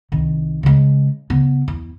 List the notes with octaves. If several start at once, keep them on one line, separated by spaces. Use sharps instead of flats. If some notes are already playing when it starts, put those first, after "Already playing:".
C2 D#3
C#3 G#3
C#3 B3
E2